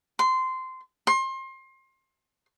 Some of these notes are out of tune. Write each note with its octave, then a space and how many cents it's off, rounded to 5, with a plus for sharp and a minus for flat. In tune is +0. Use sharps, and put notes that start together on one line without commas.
C6 -15
C6 +30